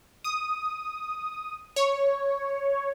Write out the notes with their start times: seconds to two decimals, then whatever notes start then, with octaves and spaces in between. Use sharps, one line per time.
0.24 D#6
1.76 C#5